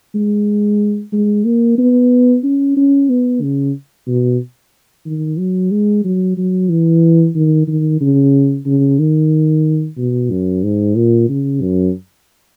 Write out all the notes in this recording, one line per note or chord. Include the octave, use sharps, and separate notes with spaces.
G#3
G#3
A#3
B3
C#4
C#4
B3
C#3
B2
D#3
F#3
G#3
F#3
F#3
E3
D#3
D#3
C#3
C#3
D#3
B2
F#2
G#2
A#2
C#3
F#2